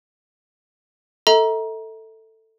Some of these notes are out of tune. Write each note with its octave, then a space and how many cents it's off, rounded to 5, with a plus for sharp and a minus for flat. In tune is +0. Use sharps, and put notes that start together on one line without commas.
A4 +15 E5 -45 A#5 +20